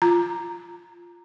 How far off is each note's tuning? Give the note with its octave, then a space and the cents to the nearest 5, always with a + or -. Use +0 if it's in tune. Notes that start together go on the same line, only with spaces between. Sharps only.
F4 +0 A#5 +0